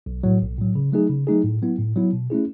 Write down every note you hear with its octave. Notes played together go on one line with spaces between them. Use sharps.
B1
A2 F#3
B1
A2 F#3
C#3
F#3 A3 D#4 G#4
C#3
F#3 A3 D#4 G#4
A2
F#3 B3 E4
A2
F#3 B3 E4
B2
A3 C#4 E4 G#4